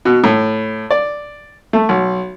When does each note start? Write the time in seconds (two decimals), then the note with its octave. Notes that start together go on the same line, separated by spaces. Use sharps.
0.05 B2
0.24 A2
0.91 D5
1.73 A3
1.89 B1